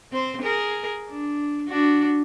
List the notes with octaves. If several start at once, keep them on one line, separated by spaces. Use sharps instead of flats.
C4 C5
G#4 A#4
D4
D4 F#4